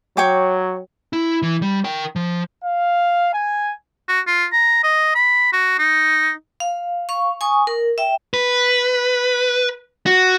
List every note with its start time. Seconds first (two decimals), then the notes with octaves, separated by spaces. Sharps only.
0.17 F#3 C#5 G5 D6
1.13 E4
1.42 E3
1.62 G3
1.84 A#4 G5
2.16 F3
2.65 F5
3.33 G#5
4.08 F#4
4.27 F4
4.52 A#5
4.84 D#5
5.15 B5
5.53 F#4
5.79 D#4
6.60 F5
7.09 F5 C#6
7.41 G#5 C#6 D#6
7.67 A#4
7.98 E5 G5
8.34 B4
10.06 F#4